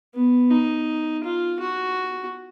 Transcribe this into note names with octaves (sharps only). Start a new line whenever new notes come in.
B3
D#4
F4
F#4